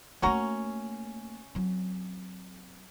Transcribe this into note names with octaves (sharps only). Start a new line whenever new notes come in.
A3 A#3 C#4 F#4 A#5
F#3 C4